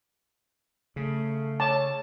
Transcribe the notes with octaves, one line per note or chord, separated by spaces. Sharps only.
C#3 A3
C#5 A5